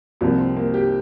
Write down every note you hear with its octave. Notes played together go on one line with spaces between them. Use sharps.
C2 C3 F3 A#3
C4
A#3
G4